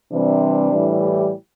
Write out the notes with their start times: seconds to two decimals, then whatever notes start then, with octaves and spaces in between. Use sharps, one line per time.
0.11 C3 E3 G3 C4 D4
0.72 A2 E3 G3
1.02 G4